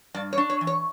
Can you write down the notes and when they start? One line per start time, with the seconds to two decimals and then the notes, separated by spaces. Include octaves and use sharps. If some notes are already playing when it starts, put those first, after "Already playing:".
0.14 G2 D5
0.33 C#5
0.38 D4
0.50 C#5
0.61 E3
0.67 C#5